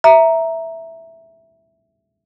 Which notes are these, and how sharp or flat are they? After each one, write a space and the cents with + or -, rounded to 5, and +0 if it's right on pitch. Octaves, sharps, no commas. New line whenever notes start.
E5 +0 A#5 +0